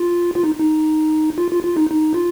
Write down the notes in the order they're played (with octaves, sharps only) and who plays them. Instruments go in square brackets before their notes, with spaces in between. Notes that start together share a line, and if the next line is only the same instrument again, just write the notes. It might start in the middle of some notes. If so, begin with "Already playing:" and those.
Already playing: [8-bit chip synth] F4
F4
D#4
D#4
F4
F4
F4
D#4
D#4
F4